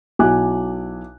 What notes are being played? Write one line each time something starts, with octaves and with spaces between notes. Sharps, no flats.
B1 E4 G#5 D6 F#6